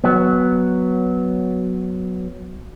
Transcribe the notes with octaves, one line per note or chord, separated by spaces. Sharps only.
F#3 B3